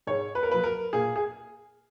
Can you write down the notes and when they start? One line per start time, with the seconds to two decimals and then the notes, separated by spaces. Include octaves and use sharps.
0.07 G#2 C#5
0.35 B4
0.43 A#4
0.49 F#3 A#3 B4
0.64 A#4
0.93 A#2 G#4
1.16 G#4